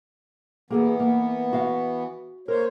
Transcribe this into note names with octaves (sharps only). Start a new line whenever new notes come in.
E3 A#3 B3 G#4 A4
A#3
F#4 F5
A#3 A#4 C5 C#5